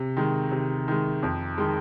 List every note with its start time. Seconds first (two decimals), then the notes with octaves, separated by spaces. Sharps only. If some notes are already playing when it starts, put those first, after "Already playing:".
Already playing: C3
0.17 D#3 G#3
0.52 C3
0.88 D#3 G#3
1.23 F2
1.58 D#3 G#3